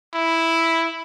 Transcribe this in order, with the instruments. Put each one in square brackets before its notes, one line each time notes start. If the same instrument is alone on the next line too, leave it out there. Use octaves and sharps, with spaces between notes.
[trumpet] E4